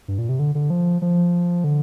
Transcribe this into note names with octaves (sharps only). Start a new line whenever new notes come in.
G2
A#2
C3
D3
D3
F3
F3
D3